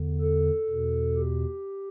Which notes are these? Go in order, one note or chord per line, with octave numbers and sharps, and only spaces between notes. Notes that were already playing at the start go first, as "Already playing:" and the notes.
Already playing: E2 D3
A4
E2 B2
G4